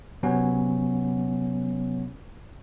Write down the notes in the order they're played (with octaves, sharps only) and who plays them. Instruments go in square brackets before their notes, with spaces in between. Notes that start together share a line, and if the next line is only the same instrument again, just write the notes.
[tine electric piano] C3 F#3 B3 C#4